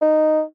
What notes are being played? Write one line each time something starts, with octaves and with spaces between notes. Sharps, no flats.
D#4